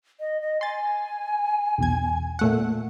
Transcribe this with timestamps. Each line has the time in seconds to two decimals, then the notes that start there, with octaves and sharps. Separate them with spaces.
0.20 D#5
0.42 D#5
0.61 G#5 C6 A6
1.78 B1 E2 G#6
2.39 A#2 A3 F#5